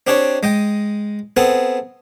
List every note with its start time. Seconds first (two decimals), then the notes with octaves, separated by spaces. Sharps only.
0.07 C4 D4 G4 G#4 C#5
0.43 G#3 D#5 G5
1.37 B3 C4 G#4 A4